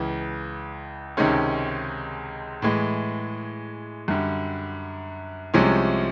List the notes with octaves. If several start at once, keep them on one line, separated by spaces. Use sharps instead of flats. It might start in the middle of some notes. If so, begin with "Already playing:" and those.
Already playing: C#2 C#3 E3
C#2 C3 D#3 G#3 C#4
A2 E3 G#3
F#2 D3 G3
C2 C3 F3 G#3 C#4